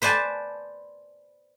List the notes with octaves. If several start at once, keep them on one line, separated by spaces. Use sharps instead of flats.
B4 C5 D5 G#5 A5